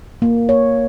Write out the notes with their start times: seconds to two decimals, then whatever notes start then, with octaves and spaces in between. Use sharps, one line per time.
0.22 A#3
0.49 C#5